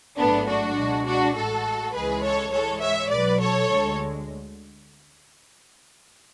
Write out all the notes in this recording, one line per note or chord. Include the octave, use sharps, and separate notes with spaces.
A1 G#2 F#3 A3 B3 D4
D4 F#4
C#2 B2 G#3
D4 F#4
A1 A2 G#3 F#4 A4
C#2 C#3 E3 G#3 G#4 B4
A4 C#5
G#2 E3 G#3 A4 C#5
C#5 E5
B1 B2 F#3 B4 D5
A4 C#5
D2 D3 G#3